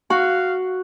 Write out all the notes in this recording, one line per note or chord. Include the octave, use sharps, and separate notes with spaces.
F#4 F5